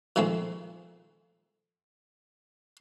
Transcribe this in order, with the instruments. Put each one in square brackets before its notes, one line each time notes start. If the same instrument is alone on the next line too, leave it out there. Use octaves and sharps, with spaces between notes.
[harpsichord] A#2 D#3 F3 G#3 A3 C4